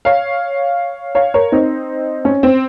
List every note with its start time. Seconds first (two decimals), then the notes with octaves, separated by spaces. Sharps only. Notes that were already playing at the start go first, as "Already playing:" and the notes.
0.05 C#5 F5
1.15 C#5 F5
1.34 A#4 C#5
1.52 C4 D#4
2.25 C#4
2.43 C4